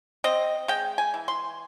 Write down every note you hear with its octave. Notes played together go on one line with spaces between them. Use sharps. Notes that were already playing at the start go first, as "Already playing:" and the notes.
C4 D#5
G#3 G5
G#5
E3
C6